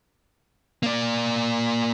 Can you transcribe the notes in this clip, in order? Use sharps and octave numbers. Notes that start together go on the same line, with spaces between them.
A#3 D5